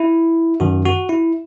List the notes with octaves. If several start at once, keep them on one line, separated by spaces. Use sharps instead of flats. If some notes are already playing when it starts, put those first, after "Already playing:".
Already playing: E4
F#2 D#3 F#4
F#4
E4